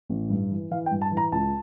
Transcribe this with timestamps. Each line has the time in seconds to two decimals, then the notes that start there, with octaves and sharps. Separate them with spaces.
0.09 A1
0.30 G2
0.51 E3
0.71 E3 F5
0.86 G5
0.91 G2
1.02 A5
1.12 E3
1.17 A#5
1.32 C#2 A5